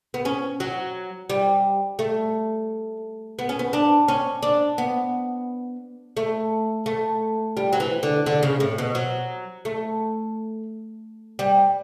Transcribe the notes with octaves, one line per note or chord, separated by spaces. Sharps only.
B3
C#4
F#3
G3
A3
B3
C#4
B3
D4
C#4
D4
B3
A3
A3
G3
F#3
E3
D3
D3
C#3
A2
B2
F#3
A3
G3